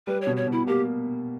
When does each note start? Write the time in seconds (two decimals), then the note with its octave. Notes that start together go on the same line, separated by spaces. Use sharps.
0.07 G3 B4
0.22 C#5
0.27 B2
0.37 C#5
0.47 B2 E4
0.67 A#3 G4